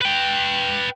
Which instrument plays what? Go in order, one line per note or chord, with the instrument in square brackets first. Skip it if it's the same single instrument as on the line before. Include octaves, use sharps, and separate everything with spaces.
[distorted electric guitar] B4 G5